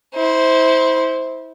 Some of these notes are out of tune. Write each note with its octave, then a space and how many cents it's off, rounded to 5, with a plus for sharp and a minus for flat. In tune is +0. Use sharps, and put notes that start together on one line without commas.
E4 -30 C5 +0